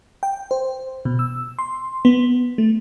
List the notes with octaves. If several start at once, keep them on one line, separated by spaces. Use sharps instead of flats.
G5
C5
B2
E6
C6
B3
A3